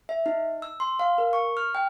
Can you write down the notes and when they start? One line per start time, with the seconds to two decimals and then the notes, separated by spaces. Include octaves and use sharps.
0.09 E5
0.26 D#4
0.62 E6
0.80 C6
0.99 F5
1.18 A#4
1.33 C#6
1.57 F6
1.75 G5